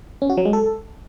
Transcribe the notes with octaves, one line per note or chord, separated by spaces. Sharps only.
C#4
F#4
F#3
G#3
A4